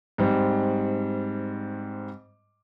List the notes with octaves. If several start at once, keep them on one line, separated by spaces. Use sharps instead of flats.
G#2 G3 C4